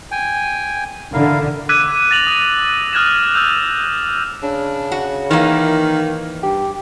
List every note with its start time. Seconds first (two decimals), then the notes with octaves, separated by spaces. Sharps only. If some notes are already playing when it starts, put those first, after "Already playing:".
0.11 G5 G#5
1.13 D3 E4 A#4 F5
1.69 D6 E6 F#6 G#6 B6 D#7
2.11 A6 A#6 F7 F#7
2.27 D#6
2.69 F#6
2.93 D#6 F6 F#6 G#6 A#6 E7
3.34 E6 F#6 G6 F7
4.43 C#3 D4
4.92 F#4
5.31 D#3 E3 A#3
6.43 G2 G4